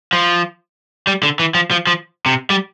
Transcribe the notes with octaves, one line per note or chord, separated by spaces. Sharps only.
F3
G3
D3
E3
F3
F3
F3
C3
G3